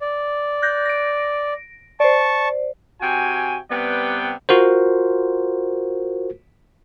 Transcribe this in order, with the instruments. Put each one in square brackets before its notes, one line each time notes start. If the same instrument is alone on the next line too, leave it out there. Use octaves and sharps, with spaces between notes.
[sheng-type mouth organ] D5
[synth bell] F#6 G6 A#6
A#6 D7
[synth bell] C5 D5 [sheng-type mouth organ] A5 C#6
[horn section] C3 F#4 G5 G#5
C3 G3 B3 B4 D5 G5
[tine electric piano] F4 F#4 A#4 C5